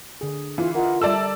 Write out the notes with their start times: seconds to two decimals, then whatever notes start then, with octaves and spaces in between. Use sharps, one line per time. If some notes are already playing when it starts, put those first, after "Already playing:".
0.21 D3 G#4
0.58 E3 F4 F5
0.75 F4 A#4 D#5 F#5
1.01 G3 A4 D5 E5 A5 E6